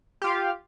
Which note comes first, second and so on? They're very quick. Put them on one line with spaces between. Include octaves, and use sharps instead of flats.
G4 F4 F5